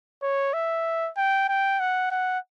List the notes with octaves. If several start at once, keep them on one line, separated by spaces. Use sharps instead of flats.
C#5
E5
G5
G5
F#5
F#5